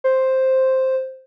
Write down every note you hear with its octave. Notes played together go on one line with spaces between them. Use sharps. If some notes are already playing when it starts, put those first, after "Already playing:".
C5